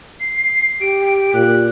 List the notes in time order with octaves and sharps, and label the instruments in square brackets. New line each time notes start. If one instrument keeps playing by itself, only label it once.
[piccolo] C7
[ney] G4 [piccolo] D7
[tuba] A#2 [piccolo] F#6